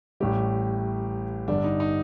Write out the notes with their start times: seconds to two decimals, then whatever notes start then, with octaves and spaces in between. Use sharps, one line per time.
0.20 A1 A2 G3 G4
1.48 G1 G2 D3 G3 D4
1.64 D#4
1.80 D#4